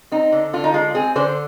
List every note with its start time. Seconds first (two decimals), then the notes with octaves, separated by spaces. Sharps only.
0.12 C4 D#4
0.32 D3
0.53 D3 F4
0.64 D#4
0.74 G#3 F4
0.94 C4 G#4
1.16 D3 C5